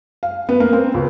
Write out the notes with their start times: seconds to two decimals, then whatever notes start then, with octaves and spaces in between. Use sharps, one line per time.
0.23 F5
0.49 B3
0.60 A#3
0.73 C4
0.94 C#2